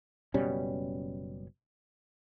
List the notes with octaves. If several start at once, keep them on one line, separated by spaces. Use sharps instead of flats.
F#1 B2 G3 C#4